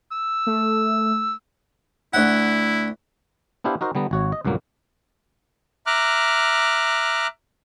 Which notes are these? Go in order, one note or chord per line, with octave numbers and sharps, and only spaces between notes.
E6
A3
D2 E4 F#5
B3 D4 E4 G4 C5 F5
D#4 F#4 A#4 C5
D3 G3 B3 A#5
G#1 F#4 C#5
D#5
C#2 G2 A#2 F#3 A#3
E5 A#5 D6 F6 F#6